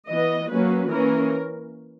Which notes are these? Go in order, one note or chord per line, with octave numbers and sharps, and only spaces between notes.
E3 B3 D#5
F#3 A#3 C#4 B4
E3 A#3 C#4 A#4